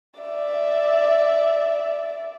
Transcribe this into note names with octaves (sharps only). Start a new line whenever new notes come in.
D5 E5